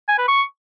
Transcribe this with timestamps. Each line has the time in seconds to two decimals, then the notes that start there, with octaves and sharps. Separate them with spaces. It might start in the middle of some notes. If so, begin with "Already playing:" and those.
0.08 G#5
0.18 B4
0.28 C#6